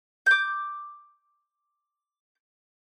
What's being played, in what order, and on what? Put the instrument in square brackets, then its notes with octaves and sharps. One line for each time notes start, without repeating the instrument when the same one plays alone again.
[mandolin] D6 G6